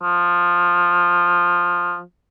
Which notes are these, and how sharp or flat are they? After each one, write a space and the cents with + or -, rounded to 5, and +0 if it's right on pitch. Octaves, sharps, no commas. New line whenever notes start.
F3 +10